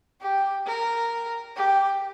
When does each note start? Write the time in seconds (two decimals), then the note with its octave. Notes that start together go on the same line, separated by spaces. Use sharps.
0.22 G4
0.66 A#4
1.56 G4